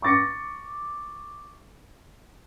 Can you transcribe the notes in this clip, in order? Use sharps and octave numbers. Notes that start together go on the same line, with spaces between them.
C#6 D6 A6 A#6 C#7